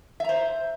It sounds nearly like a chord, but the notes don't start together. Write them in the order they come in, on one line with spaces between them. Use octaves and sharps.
E5 A#5 C5